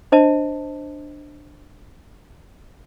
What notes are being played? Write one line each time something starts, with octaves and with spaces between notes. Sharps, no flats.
D4 C5 D#5 A5